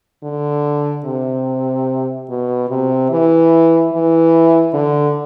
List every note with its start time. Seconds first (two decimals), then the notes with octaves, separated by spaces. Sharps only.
0.23 D3
1.05 C3
2.29 B2
2.70 C3
3.11 E3
3.93 E3
4.74 D3